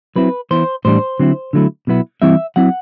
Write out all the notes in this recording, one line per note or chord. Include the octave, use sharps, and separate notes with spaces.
F#3 C4 E4 B4
E3 B3 E4 C5
A2 E3 G3 D4 C5
D3 F#3 C4 E4
D3 F#3 A3 E4
B2 F#3 B3 E4
E3 G3 C4 E4 E5
F#3 C4 E4 F#5